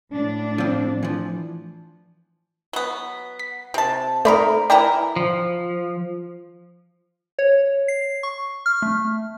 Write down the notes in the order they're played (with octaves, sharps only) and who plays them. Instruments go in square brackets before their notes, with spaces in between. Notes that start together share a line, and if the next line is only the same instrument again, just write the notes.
[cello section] A2 D4
[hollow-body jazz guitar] F3 C4
E3 F3
[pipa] F#3 B3
[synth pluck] B6
[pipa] C3 A5
[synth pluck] A3 D5 B5 [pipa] C4 D#4 A#4
[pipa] E3 E4 A#4 [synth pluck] D5 G5 B5
[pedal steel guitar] F3
[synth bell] C#5
C7
C#6
F6
A3